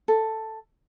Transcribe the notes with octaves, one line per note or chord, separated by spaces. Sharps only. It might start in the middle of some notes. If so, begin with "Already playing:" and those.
A4